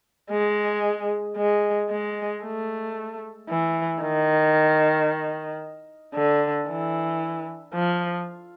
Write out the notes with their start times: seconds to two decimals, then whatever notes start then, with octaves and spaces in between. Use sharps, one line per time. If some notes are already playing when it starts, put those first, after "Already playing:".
0.31 G#3
1.37 G#3
1.90 G#3
2.43 A3
3.49 E3
4.02 D#3
6.14 D3
6.68 E3
7.74 F3